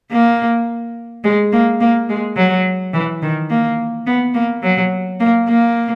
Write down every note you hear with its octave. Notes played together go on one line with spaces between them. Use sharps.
A#3
G#3
A#3
A#3
G#3
F#3
E3
D#3
A#3
B3
A#3
F#3
A#3
A#3